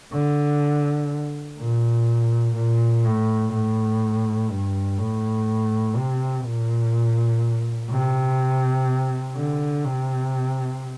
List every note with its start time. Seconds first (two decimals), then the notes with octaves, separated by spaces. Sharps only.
0.13 D3
1.59 A#2
2.56 A#2
3.04 A2
3.53 A2
4.50 G2
4.98 A2
5.96 C3
6.45 A#2
7.90 C3
9.36 D3
9.84 C3